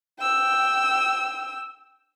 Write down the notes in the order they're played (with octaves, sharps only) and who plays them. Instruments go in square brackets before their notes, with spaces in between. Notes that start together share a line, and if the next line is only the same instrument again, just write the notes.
[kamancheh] G5 E6